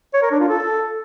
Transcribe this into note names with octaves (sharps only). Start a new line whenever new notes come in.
C#5
A#4
D4
F4
A4